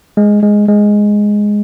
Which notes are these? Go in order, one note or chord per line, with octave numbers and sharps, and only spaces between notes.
G#3
G#3
G#3